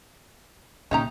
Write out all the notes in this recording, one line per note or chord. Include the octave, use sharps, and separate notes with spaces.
A#2 D3 C#4 D#4 G4 C5 E5 A#5